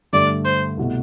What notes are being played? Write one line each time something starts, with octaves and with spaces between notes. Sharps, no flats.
G2 D3 A3 D5
C5
C2 B2 A3